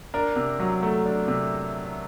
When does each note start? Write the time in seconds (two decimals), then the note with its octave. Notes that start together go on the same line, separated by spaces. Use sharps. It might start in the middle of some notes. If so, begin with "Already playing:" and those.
0.14 D4 A#4
0.36 C3
0.60 F#3
0.82 A3
1.06 D4
1.28 C3